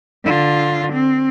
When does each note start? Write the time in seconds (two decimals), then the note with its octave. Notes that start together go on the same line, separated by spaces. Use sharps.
0.24 D3 F4
0.93 C4